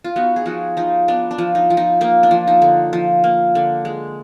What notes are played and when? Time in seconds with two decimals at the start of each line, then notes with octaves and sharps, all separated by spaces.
0.04 F4
0.16 B3 D#4 F#4
0.36 G#4
0.46 F3 D#4 F#4
0.77 F3 D#4
1.08 B3 D4
1.31 D4
1.38 F3
1.55 D#4
1.70 F3
1.77 D#4
2.01 A#3 D#4
2.23 D4
2.31 F3
2.47 D#4
2.62 D3
2.93 F3
3.24 A#3
3.55 D3
3.85 G#3